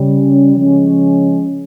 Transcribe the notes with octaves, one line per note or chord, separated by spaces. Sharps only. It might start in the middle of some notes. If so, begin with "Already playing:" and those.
Already playing: C#3 G3 C#4
C#3 F3 G#3 C#4